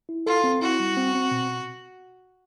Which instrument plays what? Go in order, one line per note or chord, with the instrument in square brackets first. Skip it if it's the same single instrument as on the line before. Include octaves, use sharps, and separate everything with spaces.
[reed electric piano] E4
[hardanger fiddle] F4 [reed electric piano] A4
[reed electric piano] C4
[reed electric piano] E4 [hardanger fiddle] F#4
[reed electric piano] G3
C4
C4
B2